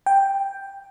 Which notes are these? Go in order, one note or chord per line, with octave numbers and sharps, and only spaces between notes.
G5